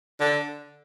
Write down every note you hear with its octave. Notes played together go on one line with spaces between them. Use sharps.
D3